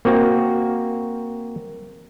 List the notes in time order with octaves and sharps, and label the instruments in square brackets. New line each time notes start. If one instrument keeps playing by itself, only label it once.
[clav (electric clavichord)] A#3 C4 F#4